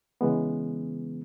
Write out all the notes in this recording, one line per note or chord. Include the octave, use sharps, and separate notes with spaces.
C#3 E3 G#3 B3